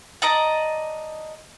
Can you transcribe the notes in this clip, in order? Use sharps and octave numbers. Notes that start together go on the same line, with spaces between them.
D5 D#5 A5 A#5